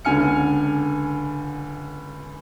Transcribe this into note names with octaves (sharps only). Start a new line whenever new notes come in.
C#2 D3 G#5 F6 C#7